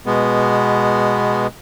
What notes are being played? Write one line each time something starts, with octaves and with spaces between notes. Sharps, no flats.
B2 G#3 B3